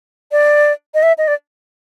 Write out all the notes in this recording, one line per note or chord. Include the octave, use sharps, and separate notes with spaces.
D5
D#5
E5
D#5
D5